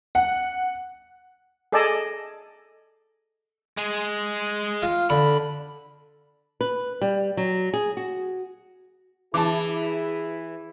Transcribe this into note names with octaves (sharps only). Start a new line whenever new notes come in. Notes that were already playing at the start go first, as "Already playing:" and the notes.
F#5
G#4 A4 D5 D#5 G#5 A5
G#3 G#4
F4
D3 B5
B4
G3
F#3
G#4
F#4
E3 E4 G#4 A5 D6